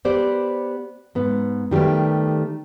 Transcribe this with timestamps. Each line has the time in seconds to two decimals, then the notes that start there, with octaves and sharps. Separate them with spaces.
0.05 B3 G4 C5 D5
1.15 G#2 B3
1.71 D#3 G3 A3 B3 G4